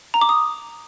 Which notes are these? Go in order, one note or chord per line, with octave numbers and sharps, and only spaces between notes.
A#5
D6
D#6